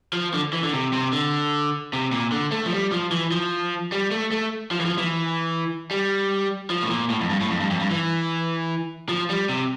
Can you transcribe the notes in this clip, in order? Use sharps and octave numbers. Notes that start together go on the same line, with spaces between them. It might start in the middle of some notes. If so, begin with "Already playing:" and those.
F3
D3
E3
D3
C3
C3
D3
C3
A#2
D3
A3
F3
G3
F3
E3
F3
G3
A3
A3
F3
E3
F3
E3
G3
F3
A2
A#2
A2
F2
G2
A2
F2
G2
F2
G2
E3
F3
G3
C3